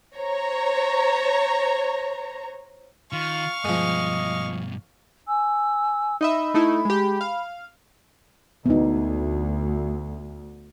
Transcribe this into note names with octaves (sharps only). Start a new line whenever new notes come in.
C5 C#5 A#5
D#3 F4 F5 C#6
G2 B2 F3 G#3 D#5
G#5 E6
D#4 D#5 E5 B5
A3 D#4 E4
G#3 G4
F5
D2 B3 D#4